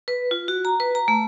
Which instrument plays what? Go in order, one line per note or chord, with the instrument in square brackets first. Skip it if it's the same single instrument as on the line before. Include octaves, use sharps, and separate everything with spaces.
[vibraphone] B4
F4
F#4
A#5
B4
A#5
A3